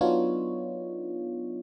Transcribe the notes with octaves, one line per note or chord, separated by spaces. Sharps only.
F#3 B3 D4 D#4 F4 C#5